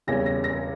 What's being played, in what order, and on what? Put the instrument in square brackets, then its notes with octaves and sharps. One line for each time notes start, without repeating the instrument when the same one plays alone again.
[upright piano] E1 E2 C#3 G3 C#4 A#6
A#6
A#6